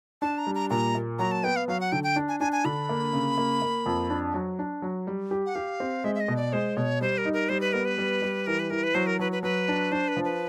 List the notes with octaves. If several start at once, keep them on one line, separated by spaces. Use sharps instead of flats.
D4 A5
A#5
G3
A#5
A#2 A#5
A#3
F#3 A#5
A5
B3 G5
F5
F#3 F5
F#5
D3 G5
G5
D4
G#5
D4 G#5
G#5
D3 B5
A#3
C#3
A#3
A#3
F2
D4
F#3
D4
F#3
G3
G4
F#5
G4 F5
C4
G#3 E5
E5
D#5
B2
D5
G#3 C5
B2 C#5
G3 C5
A#4
D#4
A#4
G3 C5
B4
B3 A#4
B4
G3
G3
E3 A#4
B4
E3 A#4
B4
F#3 C5
A#4
F#3 B4
B4
F#3 B4
D4
D4 C5
B4
F3
B4